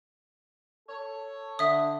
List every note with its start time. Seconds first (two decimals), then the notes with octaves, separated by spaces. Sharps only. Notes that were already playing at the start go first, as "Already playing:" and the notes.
0.88 A4 C#5
1.59 D3 E5 D#6